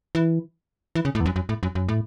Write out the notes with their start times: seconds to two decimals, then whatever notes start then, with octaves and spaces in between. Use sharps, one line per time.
0.15 E3
0.95 E3
1.05 C#3
1.15 A2
1.20 E2
1.26 F#2
1.36 F#2
1.49 A2
1.63 F#2
1.75 F#2
1.89 A2